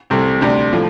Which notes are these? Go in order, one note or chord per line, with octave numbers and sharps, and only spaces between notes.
C2 C3 A3 C4
D2 C3 G3 D4
A2 F3